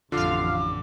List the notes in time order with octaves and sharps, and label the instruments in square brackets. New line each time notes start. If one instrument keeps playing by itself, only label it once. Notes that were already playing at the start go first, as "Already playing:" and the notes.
[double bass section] A1 F2 [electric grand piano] D3 [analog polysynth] F4 F5 [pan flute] D6